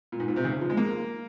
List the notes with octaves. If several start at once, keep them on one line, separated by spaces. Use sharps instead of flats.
A#2
G#2
A#2
C3
C#3
F3
G#3
A#3